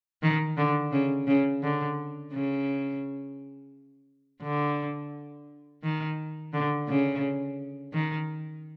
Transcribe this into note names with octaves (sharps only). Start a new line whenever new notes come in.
D#3
D3
C#3
C#3
D3
C#3
D3
D#3
D3
C#3
D#3